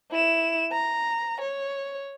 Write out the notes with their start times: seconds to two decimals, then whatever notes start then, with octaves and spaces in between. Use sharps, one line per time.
0.11 E4 E7
0.72 A#5
1.41 C#5